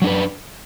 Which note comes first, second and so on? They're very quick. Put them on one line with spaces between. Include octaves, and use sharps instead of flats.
F#3 D4 B4